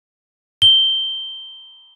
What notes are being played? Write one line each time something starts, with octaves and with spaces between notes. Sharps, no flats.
G7